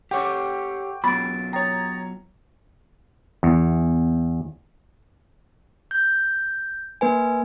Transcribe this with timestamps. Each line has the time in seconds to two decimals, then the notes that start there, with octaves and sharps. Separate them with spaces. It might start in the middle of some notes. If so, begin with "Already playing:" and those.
0.11 G4 A4 C#5 F#5 G5 C#6 D6
1.04 F#3 B3 F4 B5 A6 D7
1.53 C#5 G5 A#5 D#6 A6
3.43 E2
5.91 G6
7.01 A#3 B4 G#5